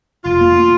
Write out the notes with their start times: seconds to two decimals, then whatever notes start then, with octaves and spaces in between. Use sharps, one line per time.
0.25 F1 F4
0.41 A#3
0.56 A#3